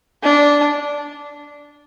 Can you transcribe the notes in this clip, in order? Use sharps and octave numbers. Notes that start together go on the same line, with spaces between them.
D4